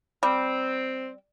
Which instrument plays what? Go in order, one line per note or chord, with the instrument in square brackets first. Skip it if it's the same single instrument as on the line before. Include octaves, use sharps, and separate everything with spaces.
[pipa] G3 [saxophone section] C4